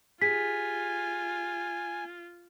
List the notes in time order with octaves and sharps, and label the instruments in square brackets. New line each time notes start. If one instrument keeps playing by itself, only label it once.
[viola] F4 [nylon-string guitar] G4 G#4 [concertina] G#5 [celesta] B6